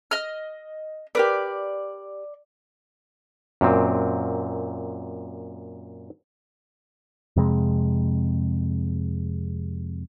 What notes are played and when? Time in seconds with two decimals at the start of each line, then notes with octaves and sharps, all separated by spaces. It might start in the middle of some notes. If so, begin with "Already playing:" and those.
0.11 D#5 F6
1.15 G4 A#4 B4 D5
3.61 F#2 A#2 C4
7.36 F2 C3 G#3